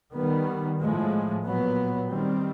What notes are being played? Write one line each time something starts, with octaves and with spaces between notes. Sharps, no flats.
D#3 G3 B3
A2 F3 G#3
A#2 F#3 B3
D#3 G3 C4